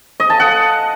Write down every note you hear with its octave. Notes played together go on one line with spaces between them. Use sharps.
D#5
A5
F#5